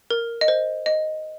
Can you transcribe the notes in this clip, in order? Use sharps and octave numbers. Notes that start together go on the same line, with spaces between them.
A#4
D#5
C5
D#5